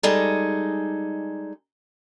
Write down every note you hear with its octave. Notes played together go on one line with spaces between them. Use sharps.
G3 G#3 D#4 G#4 A4